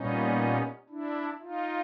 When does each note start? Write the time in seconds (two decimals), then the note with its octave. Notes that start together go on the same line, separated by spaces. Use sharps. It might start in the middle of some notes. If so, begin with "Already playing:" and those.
Already playing: A#2 G3 B3 C#4 D#4
0.89 D4 E4
1.40 D#4 F4